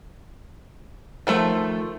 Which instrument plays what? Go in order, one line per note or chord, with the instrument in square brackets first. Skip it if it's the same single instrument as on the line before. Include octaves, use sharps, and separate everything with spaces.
[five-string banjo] D#3 F3 A3